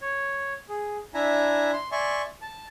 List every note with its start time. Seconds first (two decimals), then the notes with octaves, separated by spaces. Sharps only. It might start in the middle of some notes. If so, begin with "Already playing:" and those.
0.01 C#5
0.69 G#4
1.14 D4 E4 E5 G#5 A#5
1.73 C6
1.92 D5 E5 G#5 C6 C#6
2.41 A5